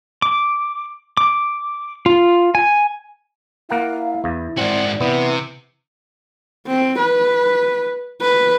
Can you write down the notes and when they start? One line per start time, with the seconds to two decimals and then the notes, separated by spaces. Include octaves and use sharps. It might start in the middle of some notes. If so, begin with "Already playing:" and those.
0.22 D6
1.17 D6
2.06 F4
2.55 G#5
3.70 A#3 E4 A#4 F5 F#5
4.24 E2
4.58 G#2 C4 F#4 D5
5.01 C3 E3 B3
6.67 C4
6.99 B4
8.22 B4